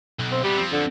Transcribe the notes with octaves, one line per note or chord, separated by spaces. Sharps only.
B1
C4
C3 G3 B3
F3 C4
D3